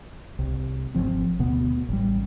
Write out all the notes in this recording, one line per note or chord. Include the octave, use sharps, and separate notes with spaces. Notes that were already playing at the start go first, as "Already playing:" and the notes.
C2
G#1 F2 F3 C4
D2 B2 B3
A1 G3